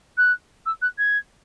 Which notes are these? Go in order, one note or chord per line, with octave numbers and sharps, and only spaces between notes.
F#6
E6
F#6
G#6